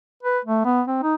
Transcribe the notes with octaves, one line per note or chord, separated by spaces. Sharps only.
B4
A3
B3
C4
D#4